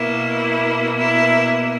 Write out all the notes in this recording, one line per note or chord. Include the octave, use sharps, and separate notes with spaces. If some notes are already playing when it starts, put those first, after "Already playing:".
Already playing: B2 A#3 E4
E4